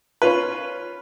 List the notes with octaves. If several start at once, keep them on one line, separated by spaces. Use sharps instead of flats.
C#4 F4 B4